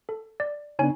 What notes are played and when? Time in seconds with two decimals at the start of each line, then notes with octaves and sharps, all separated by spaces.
0.09 A4
0.40 D5
0.79 C#3 B3 D4 D#4 C#5 G#5